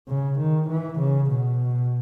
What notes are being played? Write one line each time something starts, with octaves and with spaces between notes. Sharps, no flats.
C#3
D#3
E3
C#3
B2